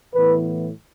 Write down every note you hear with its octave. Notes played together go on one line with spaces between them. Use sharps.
A2 E3 B3 B4